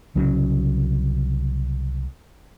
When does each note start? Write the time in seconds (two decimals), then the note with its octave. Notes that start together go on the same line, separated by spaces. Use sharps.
0.15 C2 C#3 F#3 C#4